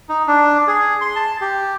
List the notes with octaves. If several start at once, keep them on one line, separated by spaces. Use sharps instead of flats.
D#4
D4
G#4
C6
A5
G4